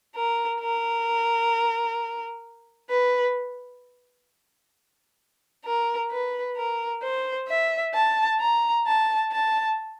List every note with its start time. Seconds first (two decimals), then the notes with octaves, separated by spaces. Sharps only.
0.15 A#4
0.61 A#4
2.90 B4
5.65 A#4
6.11 B4
6.57 A#4
7.03 C5
7.48 E5
7.94 A5
8.40 A#5
8.87 A5
9.32 A5